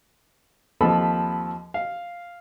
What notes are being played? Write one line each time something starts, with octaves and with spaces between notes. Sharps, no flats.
D#2 F3 C4 A4 B5
F5